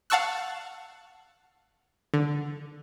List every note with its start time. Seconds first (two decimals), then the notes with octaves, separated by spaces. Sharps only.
0.10 F5 F#5 A5 C#6 E6 F#6
2.14 D3